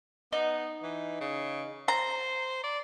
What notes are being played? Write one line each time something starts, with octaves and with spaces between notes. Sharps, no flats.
B3 D#4
E3
C#3
C5 A#5
D5